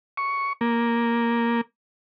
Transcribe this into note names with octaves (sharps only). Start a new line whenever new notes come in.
C#6
A#3